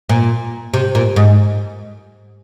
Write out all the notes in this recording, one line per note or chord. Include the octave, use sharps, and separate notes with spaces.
A#2
C3
A#2
G#2